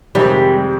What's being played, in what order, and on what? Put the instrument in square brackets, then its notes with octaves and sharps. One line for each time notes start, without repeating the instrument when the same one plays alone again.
[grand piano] F2 C3 D#3 G#3 C4 [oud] G3